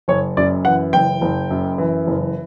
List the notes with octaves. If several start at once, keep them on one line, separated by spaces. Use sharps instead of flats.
F#1 C#5
F#2 D5
E3 F#5
F#1 G5
F#1
F#2
E3
F#1